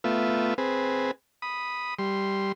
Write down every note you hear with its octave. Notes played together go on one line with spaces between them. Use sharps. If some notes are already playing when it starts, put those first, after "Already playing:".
A3 B3 F4 E5
C4 G#4 B4
B5 D#6
G3 C6